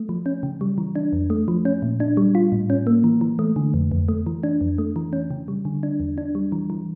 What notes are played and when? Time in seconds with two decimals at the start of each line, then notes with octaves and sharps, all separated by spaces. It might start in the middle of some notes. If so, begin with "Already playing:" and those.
Already playing: A3
0.09 F3
0.26 C#4
0.43 C#3
0.61 G3
0.78 E3
0.95 D4
1.13 F2
1.30 A3
1.48 F3
1.65 C#4
1.82 A#2
2.00 D4
2.17 G3
2.35 F4
2.52 A2
2.70 C#4
2.87 A#3
3.04 E3
3.21 E3
3.39 A3
3.56 D3
3.74 F2
3.92 F2
4.08 A3
4.26 E3
4.43 D4
4.61 F2
4.78 A3
4.96 E3
5.13 C#4
5.31 C#3
5.48 G3
5.65 D3
5.83 D4
6.00 E2
6.18 D4
6.35 G3
6.52 E3
6.70 E3